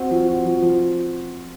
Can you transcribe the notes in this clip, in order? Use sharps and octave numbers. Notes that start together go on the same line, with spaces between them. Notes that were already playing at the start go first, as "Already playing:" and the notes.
Already playing: C4 F#4
F3
F#4
F3
F3